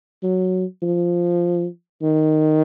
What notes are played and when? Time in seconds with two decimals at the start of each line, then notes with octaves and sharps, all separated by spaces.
0.23 F#3
0.83 F3
2.02 D#3